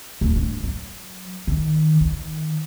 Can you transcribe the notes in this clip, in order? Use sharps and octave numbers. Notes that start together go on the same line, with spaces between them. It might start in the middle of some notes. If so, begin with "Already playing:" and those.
D1
G2
F#3
D#3
D#3